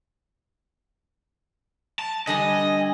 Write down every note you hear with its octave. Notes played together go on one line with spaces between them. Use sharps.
A5
D3 G3 G4 D#5 G#5